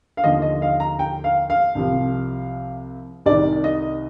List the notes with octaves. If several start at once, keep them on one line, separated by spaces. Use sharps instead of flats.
F5
D#2 D3 F3 D#5
D#5
F5
A#5
G5
F5
F5
C2 C3 F3
C2 C3 D#3 D5
D#5